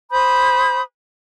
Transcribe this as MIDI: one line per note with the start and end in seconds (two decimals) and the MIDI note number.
0.11 0.81 72
0.11 0.81 83
0.11 0.81 87
0.11 0.81 91